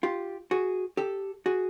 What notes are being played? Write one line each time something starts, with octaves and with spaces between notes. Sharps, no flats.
F4 G4
F#4 G#4
G4 A4
F#4 G#4